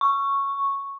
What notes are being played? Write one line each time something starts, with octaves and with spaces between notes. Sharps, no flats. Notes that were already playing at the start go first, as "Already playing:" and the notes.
C#6